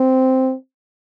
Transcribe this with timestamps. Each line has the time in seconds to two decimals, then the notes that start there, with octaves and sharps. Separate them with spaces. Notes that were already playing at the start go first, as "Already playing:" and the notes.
Already playing: C4